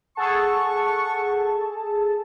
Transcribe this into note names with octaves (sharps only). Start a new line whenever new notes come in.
G#4 A4 F#5 A5 C#6